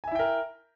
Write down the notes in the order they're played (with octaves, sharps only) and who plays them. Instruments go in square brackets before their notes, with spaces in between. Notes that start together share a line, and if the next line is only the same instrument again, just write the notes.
[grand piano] G#5
E5
E4
G5
A#4